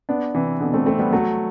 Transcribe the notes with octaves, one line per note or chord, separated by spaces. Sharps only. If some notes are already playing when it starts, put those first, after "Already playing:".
B3 D4
C3 E3
B2 D3
A3 C4
A3 C4
G3 B3
F#3 A3